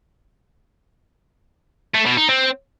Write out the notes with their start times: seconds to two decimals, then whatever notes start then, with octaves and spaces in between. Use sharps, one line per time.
1.94 A3
2.06 B2
2.17 D#4
2.29 C4